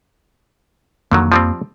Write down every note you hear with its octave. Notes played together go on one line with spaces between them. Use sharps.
F2 D3 D#3 F#3 A#3
F3 G3 C4